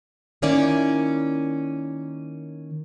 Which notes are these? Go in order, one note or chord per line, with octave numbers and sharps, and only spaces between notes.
D#3 A#3 C#4 E4 D5